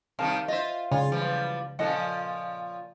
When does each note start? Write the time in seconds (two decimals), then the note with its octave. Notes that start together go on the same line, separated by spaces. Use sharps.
0.19 C3 D#3 G3 A#4 F5 A5
0.48 F4 C5 D#5 E5
0.92 C#3 F4 C#5
1.12 E3 F3 G3
1.79 A#2 F3 C#4 A4 D#5 F#5